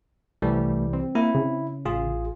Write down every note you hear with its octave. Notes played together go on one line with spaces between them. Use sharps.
C2 E3 G3 A3
C4
A#3 E4
C#3
A1 F4 G#4